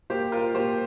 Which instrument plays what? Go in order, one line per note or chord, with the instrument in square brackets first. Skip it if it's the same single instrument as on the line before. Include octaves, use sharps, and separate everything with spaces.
[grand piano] A#3 G4 C5
F4 A#4
A#3 G4 C5